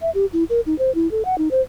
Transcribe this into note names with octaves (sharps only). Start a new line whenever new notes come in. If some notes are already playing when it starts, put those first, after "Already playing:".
E5
G4
E4
A#4
D#4
C5
E4
A4
F#5
D#4
C5